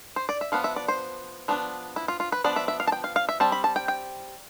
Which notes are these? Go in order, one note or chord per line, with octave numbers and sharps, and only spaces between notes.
C5
D5
E5
F3 B3 D4 F5
E5
D5
C5
F3 B3 D4
E4
F4
F4
B4
F3 B3 D4 D5
E5
E5
F5
A5
G5
F5
F5
E5
G3 C4 A5
B5
A5
G5
G5